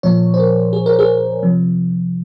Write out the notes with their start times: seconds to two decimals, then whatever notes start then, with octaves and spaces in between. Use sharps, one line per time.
0.03 A#2 F3 C#5
0.34 C5
0.39 A#4
0.73 G#4
0.86 A#4
0.99 G#4
1.43 C3 F3